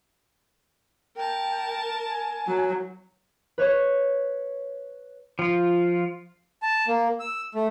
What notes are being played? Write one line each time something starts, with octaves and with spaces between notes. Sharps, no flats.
A#4 G5 A5
G#5
F#3
B4 C#5 C#6
F3 F4
A5
A#3
E6
A3